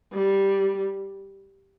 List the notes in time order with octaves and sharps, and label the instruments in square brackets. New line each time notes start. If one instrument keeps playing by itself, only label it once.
[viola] G3